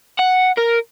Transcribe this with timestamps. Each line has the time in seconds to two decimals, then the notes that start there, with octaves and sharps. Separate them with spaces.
0.19 F#5
0.57 A#4